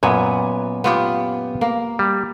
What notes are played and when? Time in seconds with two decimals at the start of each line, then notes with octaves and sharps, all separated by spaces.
0.03 F#2 A#2 B3 G#5
0.84 B3 F4 G4
1.61 A#3
1.99 G3